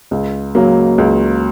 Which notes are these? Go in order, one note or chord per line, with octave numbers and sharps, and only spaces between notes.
C#2
C#3 F#3 A#3
C#2